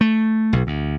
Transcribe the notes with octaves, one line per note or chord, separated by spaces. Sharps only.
A3
B1
D2